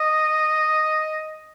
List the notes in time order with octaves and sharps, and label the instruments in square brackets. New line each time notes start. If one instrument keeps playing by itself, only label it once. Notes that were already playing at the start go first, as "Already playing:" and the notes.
Already playing: [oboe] D#5